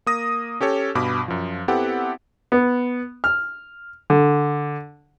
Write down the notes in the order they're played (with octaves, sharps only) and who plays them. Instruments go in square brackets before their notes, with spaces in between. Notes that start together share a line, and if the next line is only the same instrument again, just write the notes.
[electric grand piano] A#3 D#6 A#6
C#4 G4 A4 C#5
G2 B2 B5 D6
F#2 F3
B3 C4 E4 G4 A4 F#5
[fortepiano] B3
F6
D3